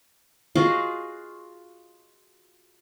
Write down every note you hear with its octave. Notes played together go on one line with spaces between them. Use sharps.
F4 F#4 G#4 D#5